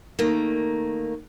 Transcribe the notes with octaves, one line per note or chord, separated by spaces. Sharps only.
D#3 A3 A#3